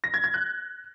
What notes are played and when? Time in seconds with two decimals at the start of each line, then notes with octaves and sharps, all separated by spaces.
0.04 A#6
0.14 G#6
0.24 G#6
0.34 F#6